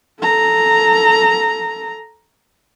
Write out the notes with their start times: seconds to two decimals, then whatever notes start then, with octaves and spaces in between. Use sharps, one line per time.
0.21 A4 A#5